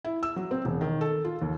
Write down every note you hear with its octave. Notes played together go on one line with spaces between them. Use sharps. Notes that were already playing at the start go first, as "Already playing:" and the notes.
E4
E6
F#3
C4
E1
D#3
A4
F4
D#2